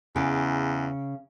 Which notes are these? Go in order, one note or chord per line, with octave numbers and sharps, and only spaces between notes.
E2 C#3